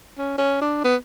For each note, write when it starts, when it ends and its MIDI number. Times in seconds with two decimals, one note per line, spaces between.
0.18 0.34 61
0.38 0.56 61
0.61 0.80 62
0.84 0.96 59